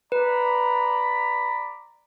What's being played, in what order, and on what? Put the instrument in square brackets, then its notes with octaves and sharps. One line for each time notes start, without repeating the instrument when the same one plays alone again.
[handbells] B4 [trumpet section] D5 A#5 B5